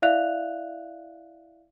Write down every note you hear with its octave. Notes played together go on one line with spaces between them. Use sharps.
E4 D5 E5 F5 F#6 F7